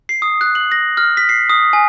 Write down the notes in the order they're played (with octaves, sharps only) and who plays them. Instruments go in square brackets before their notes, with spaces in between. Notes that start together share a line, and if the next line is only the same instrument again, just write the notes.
[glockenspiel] C7
D#6
F#6
F#7
A#6
F6
B6
C7
D#6
G#5